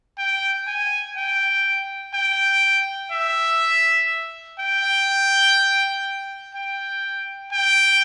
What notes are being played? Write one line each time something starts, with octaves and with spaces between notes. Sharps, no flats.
G5
G#5
G5
G5
E5
G5
G5
G5